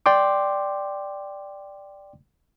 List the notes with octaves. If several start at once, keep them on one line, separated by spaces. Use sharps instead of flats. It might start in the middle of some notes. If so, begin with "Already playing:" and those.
D5 G5 C6 D6